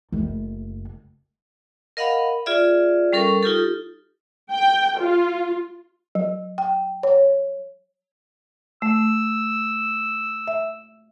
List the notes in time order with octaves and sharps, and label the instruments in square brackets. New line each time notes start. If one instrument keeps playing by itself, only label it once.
[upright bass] F#1 A3
[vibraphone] A#4 D#5 F5 F#5 B5
F4 G#4 D5 E5
G3 C#4 A4 A#4 C#6
D#4 F4 G4 A4
[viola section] G5
F4
[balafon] F#3
G5
C#5
[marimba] A3 [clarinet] E6
[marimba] E5